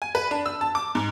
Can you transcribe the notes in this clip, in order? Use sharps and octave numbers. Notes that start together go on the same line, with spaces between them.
G#5
B4
D4
E6
A5
D6
G#2